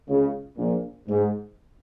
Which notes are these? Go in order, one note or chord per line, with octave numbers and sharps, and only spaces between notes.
C#2 C#3
A#1 A#2
G#2